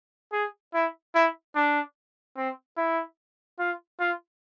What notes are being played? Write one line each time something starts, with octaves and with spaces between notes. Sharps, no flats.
G#4
E4
E4
D4
C4
E4
F4
F4